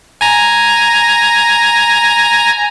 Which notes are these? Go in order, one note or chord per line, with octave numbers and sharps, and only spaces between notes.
G#5 A#5